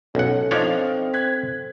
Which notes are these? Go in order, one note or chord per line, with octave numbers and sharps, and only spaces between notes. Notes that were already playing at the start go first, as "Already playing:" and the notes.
B1 C#4 A4 F#5
F3 C4 D4 D#4 C#5 F5 F7
F#6 G#6 B6